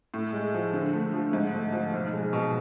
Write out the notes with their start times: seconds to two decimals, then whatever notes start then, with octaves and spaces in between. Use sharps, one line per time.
0.14 A2
0.33 G#3
0.54 F3
0.73 D3
0.93 A3
1.14 F3
1.33 G#2
1.53 A3
1.73 F3
1.93 B1
2.13 G#3
2.33 B2